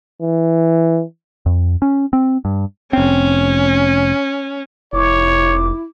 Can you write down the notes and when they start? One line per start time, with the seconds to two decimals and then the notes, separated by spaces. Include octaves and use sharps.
0.22 E3
1.46 F2
1.82 C#4
2.13 C4
2.45 G2
2.93 F1 C4 C#4
4.93 F1 E4 C#5 D6